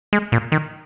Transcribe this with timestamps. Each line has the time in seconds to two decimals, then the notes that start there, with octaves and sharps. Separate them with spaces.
0.13 G#3
0.32 A#2
0.52 D#3